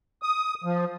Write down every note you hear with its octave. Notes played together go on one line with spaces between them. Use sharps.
D#6
F3